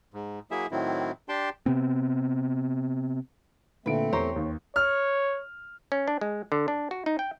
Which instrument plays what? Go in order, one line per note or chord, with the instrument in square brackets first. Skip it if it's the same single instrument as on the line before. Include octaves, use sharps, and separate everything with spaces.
[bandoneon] G#2
F#3 A#3 E4 G#4 E5
A2 D#3 F#3 C4 E4
D4 G4 G5 A5 C6
[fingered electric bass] C3 B3 C4
[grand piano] A#2 D3 D7 [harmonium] A3 C4 [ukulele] B4
[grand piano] E2 A#5 C#6 [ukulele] G4 C5 C#5
[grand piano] D#2
[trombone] C#5 [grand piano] F6
[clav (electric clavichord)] C#4
D4
G#3
D3
D4
F#4
D#4
G5